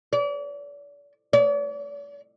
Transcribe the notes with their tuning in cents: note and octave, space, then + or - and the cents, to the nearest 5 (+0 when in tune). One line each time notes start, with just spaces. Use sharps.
D5 -40
D5 -45